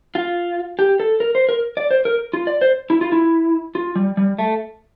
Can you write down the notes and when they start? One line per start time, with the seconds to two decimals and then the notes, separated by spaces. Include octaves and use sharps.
0.15 F4
0.79 G4
1.00 A4
1.20 A#4
1.35 C5
1.49 A#4
1.77 D5
1.91 C5
2.05 A#4
2.33 F4
2.47 D5
2.61 C5
2.90 E4
3.01 F4
3.12 E4
3.75 F4
3.96 G3
4.17 G3
4.39 A3